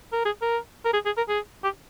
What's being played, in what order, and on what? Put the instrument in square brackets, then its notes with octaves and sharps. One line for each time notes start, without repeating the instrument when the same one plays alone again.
[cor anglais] A#4
G#4
A#4
A#4
G#4
G#4
A#4
G#4
G4